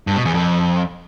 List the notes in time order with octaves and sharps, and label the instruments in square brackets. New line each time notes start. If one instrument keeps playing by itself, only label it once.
[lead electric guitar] G2
B2
E2
F2